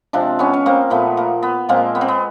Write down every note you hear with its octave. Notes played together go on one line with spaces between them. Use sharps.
C3 F3 G#3 C4 D4
B3 C#4
C#4
A#3 C4
A#2 F3 A3 B3
A#3
B3
A#2 F3 G#3 A#3 C4
B3
C4
B3